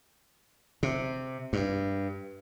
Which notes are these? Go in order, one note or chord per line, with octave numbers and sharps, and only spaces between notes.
C3
G2